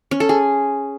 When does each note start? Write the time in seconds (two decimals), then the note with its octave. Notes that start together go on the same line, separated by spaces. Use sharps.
0.11 C#4
0.20 A4
0.29 G#4